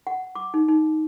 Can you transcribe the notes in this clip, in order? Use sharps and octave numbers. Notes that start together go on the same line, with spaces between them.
F#5
D6
D#4
D#4